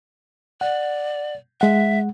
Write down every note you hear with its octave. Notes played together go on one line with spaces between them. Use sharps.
D5 F#5
G#3 E5 F#5